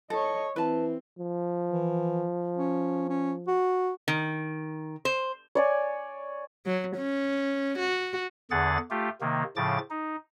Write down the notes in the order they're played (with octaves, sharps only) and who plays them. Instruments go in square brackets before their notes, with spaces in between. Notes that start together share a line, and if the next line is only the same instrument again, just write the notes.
[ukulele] A4 [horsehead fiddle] C#5 D#5
[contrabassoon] E3 [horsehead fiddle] C4 [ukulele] B4 A5
[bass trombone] F3
[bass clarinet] E3
C#4
C#4
F#4
[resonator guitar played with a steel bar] D#3
C5
[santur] C#5 D5 G#5
[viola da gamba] F#3
C#4
F#4
[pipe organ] E2 D3 G#4 F#5 A6
A3 F4 G4
C3 D#3 A#3
A2 C#3 F3 D6 A6
D#4